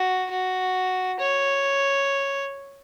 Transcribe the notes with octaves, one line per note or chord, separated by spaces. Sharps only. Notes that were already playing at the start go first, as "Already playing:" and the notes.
Already playing: F#4
F#4
C#5